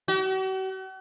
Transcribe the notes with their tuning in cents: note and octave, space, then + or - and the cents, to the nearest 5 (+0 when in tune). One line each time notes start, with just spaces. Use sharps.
F#4 +45